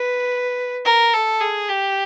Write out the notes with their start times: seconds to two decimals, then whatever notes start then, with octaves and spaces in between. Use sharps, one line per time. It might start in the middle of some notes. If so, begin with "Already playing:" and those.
Already playing: B4
0.86 A#4
1.14 A4
1.41 G#4
1.69 G4